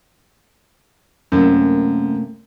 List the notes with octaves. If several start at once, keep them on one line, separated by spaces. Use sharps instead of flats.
F#2 C3 A3 A#3